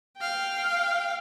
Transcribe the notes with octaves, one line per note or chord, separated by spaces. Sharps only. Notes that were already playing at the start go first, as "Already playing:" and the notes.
F5 G5